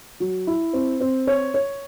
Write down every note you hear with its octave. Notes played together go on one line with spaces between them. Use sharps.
F#3
E4
C4
C4
C#5
C#5